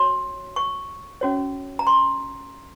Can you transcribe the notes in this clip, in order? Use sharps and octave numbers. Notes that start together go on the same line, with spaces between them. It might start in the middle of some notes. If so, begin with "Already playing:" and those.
Already playing: F#4 C#5 C6
C#6
C#4 F#4 C#5
A#5
C6